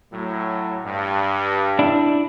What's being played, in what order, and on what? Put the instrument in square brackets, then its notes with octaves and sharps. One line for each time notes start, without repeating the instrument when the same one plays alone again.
[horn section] A2 F#3
G2
[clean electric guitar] D4 E4